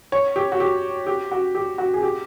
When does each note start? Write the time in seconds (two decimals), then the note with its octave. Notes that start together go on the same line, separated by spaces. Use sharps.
0.12 C#5
0.36 G4
0.52 F#4
0.60 G4
1.07 G4
1.31 F#4
1.55 G4
1.78 F#4
1.94 G#4
2.02 G4